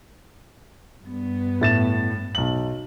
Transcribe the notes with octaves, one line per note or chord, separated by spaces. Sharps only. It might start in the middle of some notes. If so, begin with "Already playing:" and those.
G2 B3
A2 A6 E7
B1 F#7